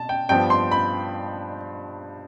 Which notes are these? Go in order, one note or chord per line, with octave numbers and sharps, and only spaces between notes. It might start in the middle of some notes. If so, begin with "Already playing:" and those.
Already playing: B2 A5
G5
G2 F3 B3 G5
C6
B5